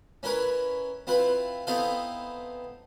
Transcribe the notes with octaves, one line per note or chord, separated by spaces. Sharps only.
C#4 E4 A#4 B4 C#5
C4 E4 F4 B4
B3 C4 D#4 E4 A4 F5